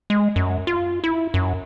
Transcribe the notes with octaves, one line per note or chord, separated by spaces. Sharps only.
G#3
F#2
F4
E4
F#2